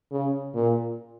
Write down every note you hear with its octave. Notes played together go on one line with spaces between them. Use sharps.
C#3
A#2